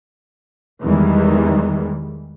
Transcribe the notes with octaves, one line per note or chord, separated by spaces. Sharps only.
E2 D#3 E3 G3 G#3